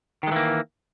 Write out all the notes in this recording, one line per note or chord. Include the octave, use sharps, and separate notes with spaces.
D#3 E3 G#3 A#3